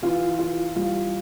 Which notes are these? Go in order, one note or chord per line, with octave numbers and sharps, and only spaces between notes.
E3 F4
E3 F4
G3 F4